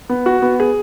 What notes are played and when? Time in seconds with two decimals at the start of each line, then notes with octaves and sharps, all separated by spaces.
0.09 B3
0.26 F#4
0.42 B3
0.60 G#4